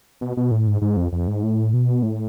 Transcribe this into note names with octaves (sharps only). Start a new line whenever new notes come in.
B2
B2
A2
G#2
G#2
F2
F2
G#2
A2
B2
A2